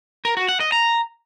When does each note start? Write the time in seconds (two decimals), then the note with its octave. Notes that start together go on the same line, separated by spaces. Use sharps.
0.25 A#4
0.37 F#4
0.49 F#5
0.60 D#5
0.72 A#5